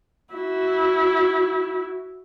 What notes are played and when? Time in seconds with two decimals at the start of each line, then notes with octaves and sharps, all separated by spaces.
0.34 E4 F#4